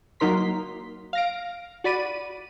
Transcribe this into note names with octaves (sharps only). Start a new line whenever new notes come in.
F#3 A#3 D#4 A#4 C6 B6
F5 A#6 D7
F#4 D5 B5 D#7